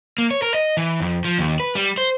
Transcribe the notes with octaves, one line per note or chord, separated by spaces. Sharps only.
A#3
C#5
A#4
D#5
E3
F2
F3
D#2
B4
G3
C5